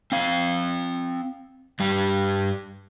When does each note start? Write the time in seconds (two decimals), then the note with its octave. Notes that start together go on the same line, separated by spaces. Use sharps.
0.12 C4 F5
1.80 G2 G3